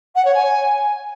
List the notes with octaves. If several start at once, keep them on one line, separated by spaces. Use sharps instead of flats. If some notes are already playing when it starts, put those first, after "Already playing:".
F#5
C#5
G#5